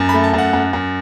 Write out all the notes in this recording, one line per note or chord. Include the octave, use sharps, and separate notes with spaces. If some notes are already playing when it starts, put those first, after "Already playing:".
Already playing: F#2
B5
A3
A5
F#2 F#5
F#2
F#2